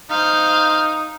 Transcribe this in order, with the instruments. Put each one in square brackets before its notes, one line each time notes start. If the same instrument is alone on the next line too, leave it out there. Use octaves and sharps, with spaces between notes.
[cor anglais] D#4 [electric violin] C5 F5